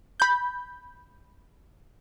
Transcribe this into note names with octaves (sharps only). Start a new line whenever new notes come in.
B5 G6